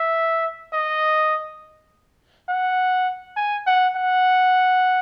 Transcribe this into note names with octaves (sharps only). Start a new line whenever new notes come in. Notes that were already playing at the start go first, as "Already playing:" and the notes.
Already playing: E5
D#5
F#5
G#5
F#5
F#5